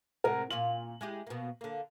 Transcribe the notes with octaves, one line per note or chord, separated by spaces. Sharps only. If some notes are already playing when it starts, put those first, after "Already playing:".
A2 C3 G#3 A#4 F#5
A#2 C#4 F4 F#7
G#3 E4 G4
B2 A#3
D3 A#3